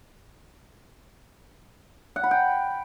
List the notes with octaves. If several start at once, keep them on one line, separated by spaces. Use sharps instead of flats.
F#5
B5
G5